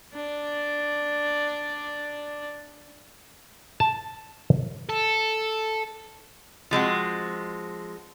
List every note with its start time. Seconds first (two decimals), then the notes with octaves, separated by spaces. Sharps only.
0.14 D4 D5
3.80 A5
4.89 A4
6.71 F3 G#3 C4 F#4